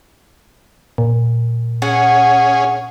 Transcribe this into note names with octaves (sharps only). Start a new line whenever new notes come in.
A#2
C#4 G#4 F#5